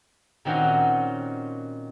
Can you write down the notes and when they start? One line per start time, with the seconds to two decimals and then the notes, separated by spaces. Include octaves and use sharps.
0.45 A#2 D#3 C4 C#4 F#4